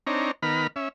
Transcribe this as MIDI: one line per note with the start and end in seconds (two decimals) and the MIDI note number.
0.07 0.31 60
0.07 0.31 62
0.07 0.31 63
0.07 0.31 73
0.07 0.31 82
0.43 0.67 51
0.43 0.67 59
0.43 0.67 70
0.43 0.67 83
0.43 0.67 89
0.76 0.89 61
0.76 0.89 76